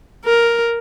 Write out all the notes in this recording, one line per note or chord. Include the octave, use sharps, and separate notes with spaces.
A#4